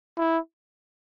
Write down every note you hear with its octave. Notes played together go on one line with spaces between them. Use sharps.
E4